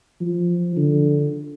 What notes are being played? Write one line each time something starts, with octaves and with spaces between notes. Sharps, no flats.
F3
D3